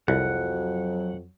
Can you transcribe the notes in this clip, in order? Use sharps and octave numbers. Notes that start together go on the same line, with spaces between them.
C2 F2 F#3 F#5